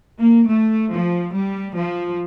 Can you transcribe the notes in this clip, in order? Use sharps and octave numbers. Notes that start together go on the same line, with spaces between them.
A#3
A3
F3
G3
F3